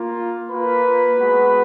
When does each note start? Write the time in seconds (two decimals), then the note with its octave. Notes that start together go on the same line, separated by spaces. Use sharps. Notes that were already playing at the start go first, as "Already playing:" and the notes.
Already playing: A#3 F4
0.49 A#3 F4 B4 B5
1.17 G#3 B3 F#4